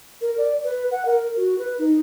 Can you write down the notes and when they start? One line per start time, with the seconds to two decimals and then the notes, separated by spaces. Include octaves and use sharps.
0.21 A#4
0.38 D5
0.64 B4
0.91 F#5
1.05 A#4
1.37 F#4
1.58 B4
1.79 D#4